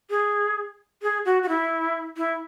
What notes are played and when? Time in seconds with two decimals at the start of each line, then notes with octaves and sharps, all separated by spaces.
0.10 G#4
1.02 G#4
1.25 F#4
1.43 F#4
1.48 E4
2.17 E4